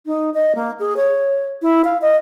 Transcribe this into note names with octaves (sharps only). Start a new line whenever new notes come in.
D#4
D#5
A#3
G#4
C#5
E4
F5
D#5